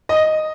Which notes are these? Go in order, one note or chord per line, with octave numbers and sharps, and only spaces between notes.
D#5